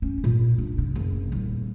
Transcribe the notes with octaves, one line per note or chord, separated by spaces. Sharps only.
C#4
A#2
D4
C3
F#1
D#1